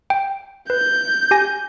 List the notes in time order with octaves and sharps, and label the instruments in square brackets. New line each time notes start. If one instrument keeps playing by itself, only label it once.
[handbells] G5
[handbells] B4 [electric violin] G6
[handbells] G4 G#5 A#6